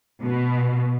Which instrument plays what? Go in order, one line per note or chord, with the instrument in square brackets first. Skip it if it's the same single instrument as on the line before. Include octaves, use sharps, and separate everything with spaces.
[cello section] B2